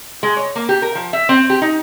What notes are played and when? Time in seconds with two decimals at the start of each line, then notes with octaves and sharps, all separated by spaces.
0.23 G#3
0.37 C#5
0.55 A#3
0.69 G4
0.82 A#4
0.95 F3
1.13 E5
1.29 C4
1.50 G4
1.62 D#4